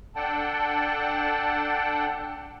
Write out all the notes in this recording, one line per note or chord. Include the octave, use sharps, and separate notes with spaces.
D4 A4 F#5 G5 A5